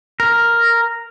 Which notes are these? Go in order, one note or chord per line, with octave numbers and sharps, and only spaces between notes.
A#4